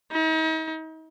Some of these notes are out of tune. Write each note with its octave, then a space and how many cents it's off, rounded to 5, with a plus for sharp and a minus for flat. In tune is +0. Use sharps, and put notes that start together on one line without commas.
D#4 +40